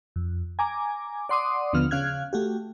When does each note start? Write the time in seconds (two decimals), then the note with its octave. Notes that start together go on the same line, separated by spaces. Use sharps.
0.16 F2
0.59 G#5 A#5 D6
1.29 D5 F#5 C6 D6 D#6
1.73 D#2 D3 F3 B3 F6
1.91 C#3 C#4 F5 F6 F#6 G#6
2.33 A3 F#4 G4